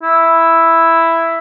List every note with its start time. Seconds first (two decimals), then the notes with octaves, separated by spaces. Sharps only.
0.03 E4